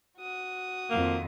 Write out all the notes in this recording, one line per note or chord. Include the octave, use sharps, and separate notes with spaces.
F#4 D#6
F2 D#3 A#3